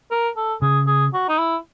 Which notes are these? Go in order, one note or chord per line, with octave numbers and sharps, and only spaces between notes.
A#4
A4
C#3 G#4
G#4
F#4
D#4
E4